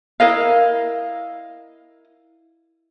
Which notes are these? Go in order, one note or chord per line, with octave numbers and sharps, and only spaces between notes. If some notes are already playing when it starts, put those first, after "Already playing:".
E4 A#4 D#5 F5